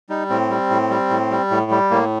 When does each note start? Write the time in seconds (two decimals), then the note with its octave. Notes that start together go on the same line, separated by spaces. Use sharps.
0.09 G3 D#4
0.30 A2 C4
0.50 G3
0.70 A2
0.90 G3
1.10 A2
1.31 G3
1.51 A2
1.71 G3
1.91 A2 A#3